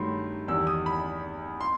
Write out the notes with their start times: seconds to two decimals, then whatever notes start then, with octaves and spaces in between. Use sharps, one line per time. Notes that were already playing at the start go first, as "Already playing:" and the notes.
Already playing: G2 D#3 F#3 A3 B5 C6
0.48 E2 D#3 G3 E6
0.67 D#6
0.86 B5
1.61 C6